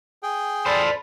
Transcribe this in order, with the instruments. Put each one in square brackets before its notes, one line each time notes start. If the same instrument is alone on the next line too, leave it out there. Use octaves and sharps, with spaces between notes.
[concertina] G#4 G5
[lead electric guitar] A4 C5 [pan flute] D5 [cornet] B5